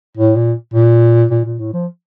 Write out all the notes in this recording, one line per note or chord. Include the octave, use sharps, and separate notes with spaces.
A2
A#2
A#2
A#2
A#2
A2
F3